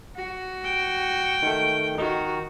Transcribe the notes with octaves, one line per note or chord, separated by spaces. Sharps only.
F#4
G5
D#3 A3
D#3 D#4 F#4